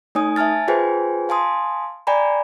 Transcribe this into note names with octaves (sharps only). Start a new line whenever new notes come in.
A3 D#4 C#5 G#5 D#6
E5 G#5 A5 F6 A6
F4 G#4 B4 C5 G5 G#5
F5 G#5 A5 C6 D#6
D5 G5 G#5 A#5 B5